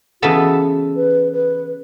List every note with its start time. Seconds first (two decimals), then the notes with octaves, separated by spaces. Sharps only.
0.22 C#3 E3 B3 F#4 A4 E5
0.96 B4
1.33 B4